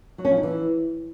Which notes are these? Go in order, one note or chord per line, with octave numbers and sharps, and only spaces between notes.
F#3
C#4
F3
D#4
E3